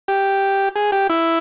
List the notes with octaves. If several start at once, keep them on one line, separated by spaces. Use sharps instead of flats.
G4
G#4
G4
E4